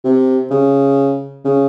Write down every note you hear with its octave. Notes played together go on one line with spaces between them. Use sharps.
C3
C#3
C#3